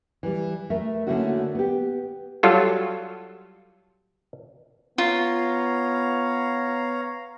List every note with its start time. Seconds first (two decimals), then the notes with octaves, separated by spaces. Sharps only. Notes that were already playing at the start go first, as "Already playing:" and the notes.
0.23 E3 G3
0.70 A3 A#4 E5
1.07 D3 A3 A#3 C#4 E4 F#4
1.55 B3 G4
2.43 F#3 G3 F4 A4
4.98 B3 F4 C#5 F5 A#5